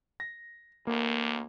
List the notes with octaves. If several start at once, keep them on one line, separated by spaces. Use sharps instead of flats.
A#6
D2 A#3